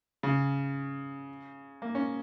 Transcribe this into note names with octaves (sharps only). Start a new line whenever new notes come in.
C#3
A#3
C#4